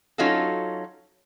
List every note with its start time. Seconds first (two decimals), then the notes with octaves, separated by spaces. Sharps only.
0.18 F#3 C#4 D#4 F4 F#4 A4